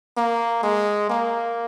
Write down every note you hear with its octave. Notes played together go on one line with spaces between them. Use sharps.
A#3
G#3
A#3